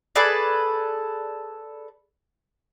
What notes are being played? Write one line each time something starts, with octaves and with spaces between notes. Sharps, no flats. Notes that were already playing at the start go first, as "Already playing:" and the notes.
G#4 A4 B4 D5